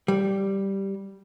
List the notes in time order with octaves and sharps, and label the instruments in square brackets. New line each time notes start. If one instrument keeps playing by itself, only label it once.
[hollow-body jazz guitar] G3